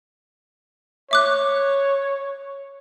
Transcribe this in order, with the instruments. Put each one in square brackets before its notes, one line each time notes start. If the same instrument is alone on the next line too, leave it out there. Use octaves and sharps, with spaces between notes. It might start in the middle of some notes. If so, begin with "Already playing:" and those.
[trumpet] C#5 [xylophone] E5 D6 F#6